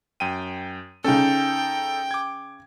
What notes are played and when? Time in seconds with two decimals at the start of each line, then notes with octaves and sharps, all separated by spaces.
0.20 F#2 G5 D#7
1.04 C#3 C#4 D#4 A4 G5
2.11 D6 G#6